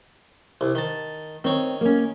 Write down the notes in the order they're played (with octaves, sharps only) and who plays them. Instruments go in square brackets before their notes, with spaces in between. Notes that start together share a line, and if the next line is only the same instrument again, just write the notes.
[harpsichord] C2
D#3 A5
[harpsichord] D#3 C#5 [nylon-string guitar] C4
[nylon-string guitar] A#3 C#4